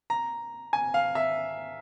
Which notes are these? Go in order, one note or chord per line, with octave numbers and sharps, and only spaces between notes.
A#5
G#5
F5
E5